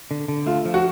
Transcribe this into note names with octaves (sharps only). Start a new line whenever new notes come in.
D3
D3
A3 F4
F3
F#4